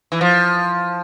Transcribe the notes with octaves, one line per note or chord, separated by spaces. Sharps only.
E3
F3